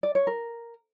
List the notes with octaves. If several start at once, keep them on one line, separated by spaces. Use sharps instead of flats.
D5
C#5
A#4